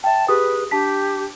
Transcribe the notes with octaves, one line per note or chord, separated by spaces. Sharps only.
E5 G5 A5
G4 G#4 B4 D#6
D4 G4 A5 B6